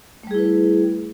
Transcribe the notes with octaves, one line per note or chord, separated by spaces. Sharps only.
G3 A3 E4 G#4 B4